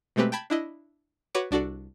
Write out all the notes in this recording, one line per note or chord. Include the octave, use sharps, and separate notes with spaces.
B2 G#3 A3 C4 G4 B4
G5 A5 B5 G#6
D4 E4 D#5
F#4 B4 C#5 F#5 C#6 D6
C2 D4 F#4 A4 D5